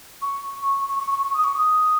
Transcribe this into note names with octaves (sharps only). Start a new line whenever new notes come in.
C#6
C#6
C#6
C#6
C#6
D#6
C#6
D#6